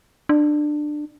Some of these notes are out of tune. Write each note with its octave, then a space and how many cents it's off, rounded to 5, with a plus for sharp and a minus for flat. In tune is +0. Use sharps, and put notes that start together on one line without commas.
D4 +20